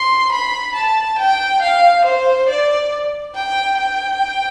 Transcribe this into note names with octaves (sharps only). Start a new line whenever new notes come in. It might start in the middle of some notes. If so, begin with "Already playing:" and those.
Already playing: C6
B5
A5
G5
F5
C5
D5
G5
G5